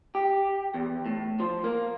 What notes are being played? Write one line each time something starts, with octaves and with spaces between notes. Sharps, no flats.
G4
E2
A2
F3
A#3